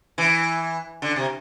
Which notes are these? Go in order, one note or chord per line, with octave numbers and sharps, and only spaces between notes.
E3
D3
C3